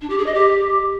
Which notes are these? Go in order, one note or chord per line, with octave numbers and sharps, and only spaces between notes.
D4
G4
G#4
D#5
G4